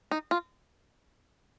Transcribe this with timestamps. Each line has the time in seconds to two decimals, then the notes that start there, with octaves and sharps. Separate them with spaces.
0.11 D#4
0.31 F4